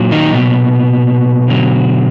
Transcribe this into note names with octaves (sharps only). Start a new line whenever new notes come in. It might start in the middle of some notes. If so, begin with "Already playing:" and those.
Already playing: A#2 F#3
D#3 D#4
B2 B3
D3 F#3